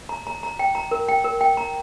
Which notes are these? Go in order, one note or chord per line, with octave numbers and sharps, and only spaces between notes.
A#5
A#5
A#5
G5
A#5
A#4
G5
A#4
G5
A#5